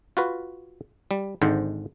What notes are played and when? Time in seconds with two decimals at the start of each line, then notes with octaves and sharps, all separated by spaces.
0.17 F4 F#4 B4
1.11 G3
1.42 G#1 G#2 D3 C5